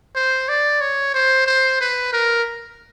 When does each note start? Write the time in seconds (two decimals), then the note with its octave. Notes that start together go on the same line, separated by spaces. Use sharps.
0.16 C5
0.49 D5
0.81 C#5
1.14 C5
1.46 C5
1.81 B4
2.13 A#4